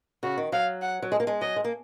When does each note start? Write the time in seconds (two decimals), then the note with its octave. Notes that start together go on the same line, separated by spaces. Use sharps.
0.23 C#3 F#4
0.38 D#3
0.52 F#3 F5
0.82 F#5
1.02 F#3
1.12 G#3
1.20 A#3
1.27 G#3
1.41 F#3 D#5
1.56 G#3
1.64 A#3